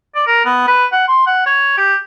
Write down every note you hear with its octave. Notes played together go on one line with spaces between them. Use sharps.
D5
A#4
B3
B4
F#5
C6
F#5
C#5
G4